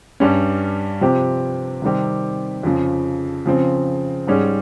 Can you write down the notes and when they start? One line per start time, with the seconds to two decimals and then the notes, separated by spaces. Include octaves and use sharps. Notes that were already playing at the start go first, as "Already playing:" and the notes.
0.20 G2 G3 C#4
1.01 C3 F3 C4 G4
1.82 C3 D#3 G3 C4 G4
2.63 F2 C#3 F3
3.46 C#3 F3 C4
4.27 G#2 G3 C#4 G#4